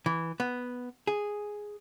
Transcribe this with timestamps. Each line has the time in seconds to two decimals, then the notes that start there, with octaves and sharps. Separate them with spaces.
0.06 E3
0.40 B3
1.07 G#4